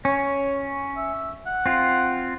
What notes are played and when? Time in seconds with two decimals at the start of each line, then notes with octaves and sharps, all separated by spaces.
0.05 C#4 C#5
0.97 E5
1.46 F#5
1.66 C4 F4